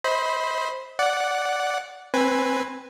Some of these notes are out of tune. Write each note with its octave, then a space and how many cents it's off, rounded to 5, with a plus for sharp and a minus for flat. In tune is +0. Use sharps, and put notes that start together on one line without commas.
C5 +5 D#5 +40 B5 +0
D5 -10 F#5 +0
C4 +15 B4 +0 G#5 -5